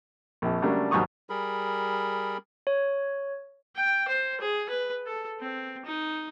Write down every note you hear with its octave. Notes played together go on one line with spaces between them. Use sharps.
A#1 F2
C#3 F#3 G3 A3 A#3 D4
D#2 G#2 F#3 G3 C#6 D#6
G3 G#4 A#4 B5
C#5
G5
C5
G#4
B4
A4
C4
D#4